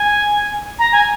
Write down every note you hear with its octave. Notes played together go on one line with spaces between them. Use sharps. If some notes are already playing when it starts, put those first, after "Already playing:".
Already playing: G#5
A#5
G#5